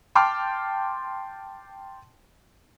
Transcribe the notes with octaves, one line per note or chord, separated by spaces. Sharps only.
G5 A5 C6 D6 F6